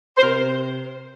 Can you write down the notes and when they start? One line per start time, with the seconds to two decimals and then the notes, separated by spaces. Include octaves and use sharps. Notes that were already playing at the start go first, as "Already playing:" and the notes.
0.18 C5
0.23 C3 A#4